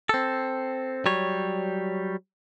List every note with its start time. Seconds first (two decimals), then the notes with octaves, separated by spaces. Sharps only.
0.09 C4 A4
1.06 F#3 G3 C#5